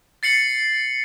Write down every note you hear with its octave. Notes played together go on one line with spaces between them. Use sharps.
A6 C7 C#7 F#7